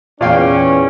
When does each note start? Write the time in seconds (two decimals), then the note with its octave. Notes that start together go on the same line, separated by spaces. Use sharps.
0.21 E2 A#2 C#4 F5 G5